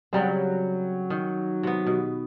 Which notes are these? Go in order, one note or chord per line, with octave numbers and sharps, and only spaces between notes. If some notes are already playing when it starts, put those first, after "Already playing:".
C#3 F#3 G3 C4
D#3
C3 B3
B2